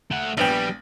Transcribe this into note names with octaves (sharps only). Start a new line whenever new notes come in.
A3 F#5
A#1 G3 B3 G5